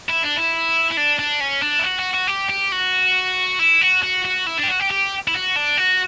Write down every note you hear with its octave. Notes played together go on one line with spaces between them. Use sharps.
E4
D4
E4
E4
D4
D4
C#4
D4
E4
F#4
F#4
F#4
G4
G4
F#4
E4
F#4
F#4
F#4
E4
D4
G4
F#4
G4
G4
E4
F#4
D4
F#4